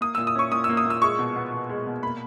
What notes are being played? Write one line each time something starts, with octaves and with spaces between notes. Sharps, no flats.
A#3 D#6
A#2 E6
D#6
C#4 C#6
A#2 D#6
E6
A#3
D#6
A#2 E6
G#3 C#6
B2
B3
B2
G#3
B2
A#3 B5